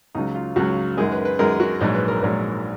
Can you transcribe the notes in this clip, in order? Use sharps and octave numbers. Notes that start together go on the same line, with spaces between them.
C#2 C#3 F#3 D#4
F4
C#2 C#3 F#3 F#4
F#2 D#3 G#3 G#4
B4
B4
F#2 D#3 G#3 A#4
F#4
A#1 G#2 F#3 D#4
B4
A#4
A#1 G#2 F#3 A#4